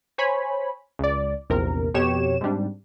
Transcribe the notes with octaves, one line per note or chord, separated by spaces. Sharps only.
C5 C#5 G#5 B5
C#2 D5
A#1 E2 C3 A#4
F2 B2 G4 C#5 E7
G#2 C3 G3 D4